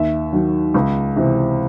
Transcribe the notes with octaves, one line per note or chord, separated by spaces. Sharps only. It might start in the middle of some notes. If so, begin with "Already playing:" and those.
Already playing: D#2 E5
D#3 F#3
C#2
C3 E3